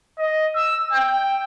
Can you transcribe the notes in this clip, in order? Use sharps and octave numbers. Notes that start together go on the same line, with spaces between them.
D#5
E6
G5